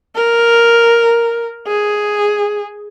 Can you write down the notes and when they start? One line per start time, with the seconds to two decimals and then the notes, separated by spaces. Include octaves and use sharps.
0.16 A#4
1.67 G#4